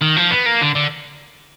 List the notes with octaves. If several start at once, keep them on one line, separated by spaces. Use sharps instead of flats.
D#3
F3
B3
A#3
D3
D3